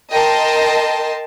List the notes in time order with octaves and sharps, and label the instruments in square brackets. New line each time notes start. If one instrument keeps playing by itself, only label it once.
[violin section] A#4 D#5 G5 A5 C6